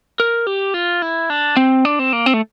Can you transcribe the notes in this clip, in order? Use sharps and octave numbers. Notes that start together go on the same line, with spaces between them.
A#4
G4
F4
E4
D4
C4
D4
C4
A#3
C4
A3